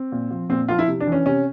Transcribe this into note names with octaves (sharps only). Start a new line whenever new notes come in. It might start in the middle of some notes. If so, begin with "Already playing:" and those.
Already playing: C4
A#2
F3
A#2 C4
F3 F4
E4
C3
D4
E3
C#4
C3 C#4